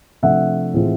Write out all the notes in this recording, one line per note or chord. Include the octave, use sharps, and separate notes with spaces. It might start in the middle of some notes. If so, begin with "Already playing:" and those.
C3 F3 A3 D4 E5 F#5
A2 E3 G#3 C4 F4